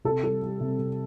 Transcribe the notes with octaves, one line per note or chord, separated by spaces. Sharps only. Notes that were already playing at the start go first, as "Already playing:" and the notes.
C3 A4
G3 A4
G3
C3
C3